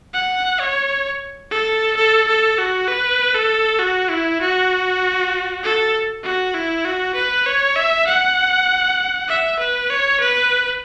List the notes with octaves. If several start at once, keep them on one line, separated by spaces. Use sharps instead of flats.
F#5
C#5
A4
A4
A4
F#4
B4
A4
F#4
E4
F#4
A4
F#4
E4
F#4
B4
C#5
E5
F#5
E5
B4
C#5
B4